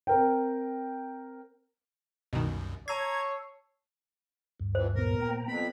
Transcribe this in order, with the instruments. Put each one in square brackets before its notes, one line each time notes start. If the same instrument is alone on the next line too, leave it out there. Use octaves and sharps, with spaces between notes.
[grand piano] C4 A#4 G5
[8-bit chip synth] C2 F#2 [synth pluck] B2 D#3
[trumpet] C#5 [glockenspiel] A5 E6 C7 [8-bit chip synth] A#5 G#6
[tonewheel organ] D2 G2
[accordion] F2 E3 [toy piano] C5
[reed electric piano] A#2 B3 [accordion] A#4
[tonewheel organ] A#3 G5 A#5
[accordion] F2 B5 [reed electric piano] B3